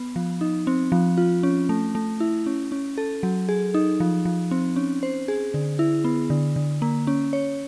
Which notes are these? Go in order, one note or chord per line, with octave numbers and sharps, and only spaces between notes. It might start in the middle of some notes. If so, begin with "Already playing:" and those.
Already playing: B3
F3
D#4
C4
F3
F4
C#4
A3
A3
E4
C#4
C#4
A4
F#3
G#4
D#4
F3
F3
C4
C#4
C5
G#4
D3
E4
B3
D3
D3
A#3
C#4
C#5